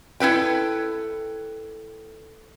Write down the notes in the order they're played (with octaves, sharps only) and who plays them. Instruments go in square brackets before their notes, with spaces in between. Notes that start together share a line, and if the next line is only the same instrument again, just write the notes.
[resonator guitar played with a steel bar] E4 A4 B4 G5